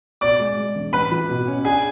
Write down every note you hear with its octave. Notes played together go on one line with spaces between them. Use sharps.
B2 D5 D6
G#3
G#3
E1
A1 B4 B5
E3
B2
C#4
D4 G#4 G#5